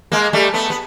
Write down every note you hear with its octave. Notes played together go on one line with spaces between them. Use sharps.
G#3 A#3
G3 A3
A3 B3
B3